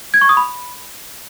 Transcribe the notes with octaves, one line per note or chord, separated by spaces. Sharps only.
G#6
C#6
D#6
B5